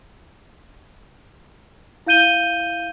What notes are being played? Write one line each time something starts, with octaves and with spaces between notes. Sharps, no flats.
E4 F5 G6 D#7 G7